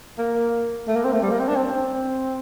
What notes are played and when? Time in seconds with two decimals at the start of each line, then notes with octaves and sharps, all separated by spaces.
0.18 A#3
0.88 A3
0.96 A#3
1.04 C4
1.12 A3
1.22 G3
1.31 A#3
1.40 C4
1.48 D4
1.56 C4